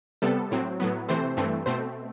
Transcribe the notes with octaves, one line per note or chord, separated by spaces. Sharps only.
C3 G3 B3 A4
A2 F#3 C4
A2 F#3 B3
C3 E3 A3 C4 C5
G2 E3 A3 C4
B2 A3 C4 C5